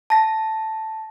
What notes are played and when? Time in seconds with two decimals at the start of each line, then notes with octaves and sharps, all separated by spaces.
0.10 A5 A#6